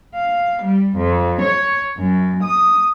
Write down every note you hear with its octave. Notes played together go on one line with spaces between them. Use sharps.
F5
G3
F2
C#5
F#2
D#6